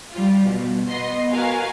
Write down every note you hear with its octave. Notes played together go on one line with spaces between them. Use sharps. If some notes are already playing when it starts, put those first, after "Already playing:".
G3 F4
B2
B3 D#5 C6
F#4 A#4 B4 F5 G#5